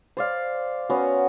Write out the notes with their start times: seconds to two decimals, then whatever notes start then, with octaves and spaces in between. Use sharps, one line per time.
0.17 C5 D5 F5
0.90 B3 C#4 F#4